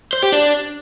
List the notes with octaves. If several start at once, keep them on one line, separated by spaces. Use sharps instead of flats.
C5
G4
D4